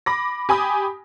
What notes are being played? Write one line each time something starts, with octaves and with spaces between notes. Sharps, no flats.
B5 D6 A#6
G4 G#5 B5 D#6